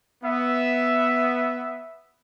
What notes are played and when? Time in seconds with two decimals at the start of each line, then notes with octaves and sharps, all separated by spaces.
0.23 B3 E5